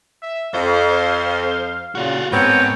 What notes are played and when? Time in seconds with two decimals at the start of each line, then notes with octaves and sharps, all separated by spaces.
0.22 E5
0.54 F2 C5 F5
1.95 A#2 C#3 F4 F#4
2.32 G#2 B3 C4 A#4 C#5 G5